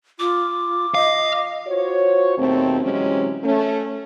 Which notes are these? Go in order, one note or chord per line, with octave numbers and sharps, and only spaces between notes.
F4 D6
D#5 F5
F4 F#4 C5 C#5
D#2 B2 A3 C4
C3 E3 F#3 G#3 C#4
A3 C#4